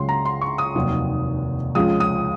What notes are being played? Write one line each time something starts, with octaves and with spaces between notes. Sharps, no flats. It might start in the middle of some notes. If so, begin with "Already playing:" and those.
Already playing: C#2 C#3 F#3 C6
A#5
C6
C#6
D#6
F1 D#2 D#3 F#3
C#2 C#3 F3 G#3 D#6
D#6